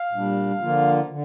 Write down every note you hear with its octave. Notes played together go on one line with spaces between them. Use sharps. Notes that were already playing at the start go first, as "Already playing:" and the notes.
Already playing: F5
A#2 G3 D4
D3 F3 A#3 F4
D3